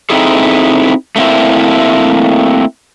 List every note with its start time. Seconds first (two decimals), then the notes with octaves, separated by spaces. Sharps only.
0.10 C4 D#4 E4 G#4 A4
1.16 A3 A#3 C4 E4